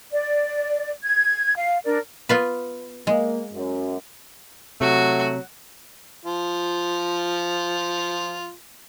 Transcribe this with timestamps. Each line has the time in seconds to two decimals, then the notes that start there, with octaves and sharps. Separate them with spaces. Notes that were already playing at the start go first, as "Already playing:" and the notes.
0.11 D5
1.03 G#6
1.56 F5
1.85 D4 A#4 D5
2.29 B3 F4 B4
3.07 G#3 A#3
3.53 F#2
4.81 C3 F#3 A3 F#4
6.25 F3 F4